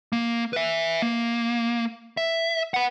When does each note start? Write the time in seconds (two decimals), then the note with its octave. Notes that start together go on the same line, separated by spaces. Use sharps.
0.13 A#3
0.53 B4 E5
1.02 A#3
2.17 E5
2.74 B4 F#5